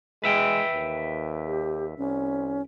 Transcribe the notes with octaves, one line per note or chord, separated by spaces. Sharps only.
G#3 B4 E5 G5
D#2
G4
C2 C#4